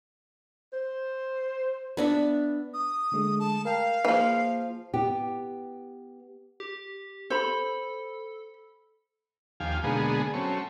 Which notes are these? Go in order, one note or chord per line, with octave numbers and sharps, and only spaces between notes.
C5
B3 D4 E5
D#6
D3 G#3 A3
A5
A#4 F5 G5
E3 F3 A#3 G#4
B3 G4
G4
A4 C5 B5
D#2 F3 G4 F5 G#5
B2 D3 G#3 A#3 B3 G#4
F#3 A3 C4 C#4